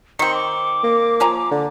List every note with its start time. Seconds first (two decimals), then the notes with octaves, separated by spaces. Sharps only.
0.19 D#3 C4 C#7
0.34 D6
0.84 A#3
1.20 F3 G#5 A#5
1.51 D3